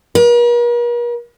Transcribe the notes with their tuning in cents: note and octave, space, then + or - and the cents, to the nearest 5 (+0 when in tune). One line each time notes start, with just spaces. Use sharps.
A#4 +45